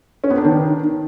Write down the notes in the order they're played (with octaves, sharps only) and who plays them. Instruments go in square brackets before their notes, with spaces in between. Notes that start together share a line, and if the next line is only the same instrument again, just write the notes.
[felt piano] C#4
B3
D4
D#3